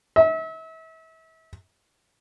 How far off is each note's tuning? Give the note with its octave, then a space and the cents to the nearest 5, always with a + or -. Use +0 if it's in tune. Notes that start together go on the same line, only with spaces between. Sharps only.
E5 -35